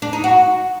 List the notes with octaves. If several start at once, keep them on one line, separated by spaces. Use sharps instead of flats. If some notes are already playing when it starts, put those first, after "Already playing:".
D4
D#4
F#4